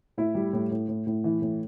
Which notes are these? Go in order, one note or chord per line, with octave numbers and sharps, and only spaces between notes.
A2 E4
G3
A2
A2
A2
A2
E3
A2